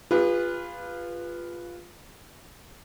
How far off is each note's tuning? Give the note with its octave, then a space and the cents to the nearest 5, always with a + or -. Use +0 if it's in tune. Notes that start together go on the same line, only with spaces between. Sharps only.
F4 +0 G#4 -45 B4 +0